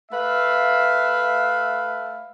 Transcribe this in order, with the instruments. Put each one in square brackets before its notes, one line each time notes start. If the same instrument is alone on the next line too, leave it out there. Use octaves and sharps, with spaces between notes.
[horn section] A3 B4 E5 F5